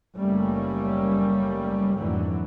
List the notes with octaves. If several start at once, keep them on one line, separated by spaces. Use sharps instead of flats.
F#1 G3 A3 A#3 C#4
F2 G#2 D3 E3 F#3